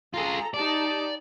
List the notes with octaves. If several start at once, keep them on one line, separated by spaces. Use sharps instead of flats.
F4 G#4 A4 A#5
D#4 G4 D5 A5